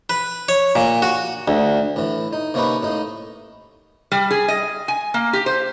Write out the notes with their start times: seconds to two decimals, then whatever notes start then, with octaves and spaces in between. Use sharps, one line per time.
0.10 B4
0.49 C#5
0.76 A#2
1.02 F#4
1.48 D2
1.96 A2 E3
2.33 D#4
2.54 C3 A#3 C#4 D#4 B4
2.83 A2 D#4
4.12 G3
4.31 G#4
4.48 D#5
4.88 G#5
5.14 A#3
5.33 G4
5.46 C5